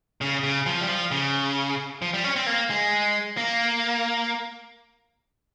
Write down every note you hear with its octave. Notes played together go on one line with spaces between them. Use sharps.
C#3
C#3
F3
G3
F3
C#3
F3
G3
C#4
C4
A#3
G#3
A#3